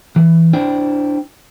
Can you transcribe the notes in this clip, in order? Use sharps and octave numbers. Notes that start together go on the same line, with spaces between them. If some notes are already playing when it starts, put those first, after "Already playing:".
E3
D4 E4 C5 D5 G5